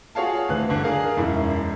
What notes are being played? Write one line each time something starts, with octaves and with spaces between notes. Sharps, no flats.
F4 F#4 G#4 C#5 F5 A5
D2 E3 F#6
G1 D3
G#4 A#4 F5
E1 F#2 E4